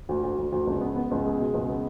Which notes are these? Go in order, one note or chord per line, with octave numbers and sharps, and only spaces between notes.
D2
D2
D2
D2
C#2
B3
B3
C#2
G#3
B2
C#2
B3